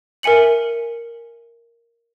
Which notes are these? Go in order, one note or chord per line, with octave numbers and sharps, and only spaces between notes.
A#4 E5 G#5 C#7 F#7